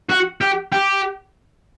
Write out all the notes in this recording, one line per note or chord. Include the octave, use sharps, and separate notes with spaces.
F#4
G4
G4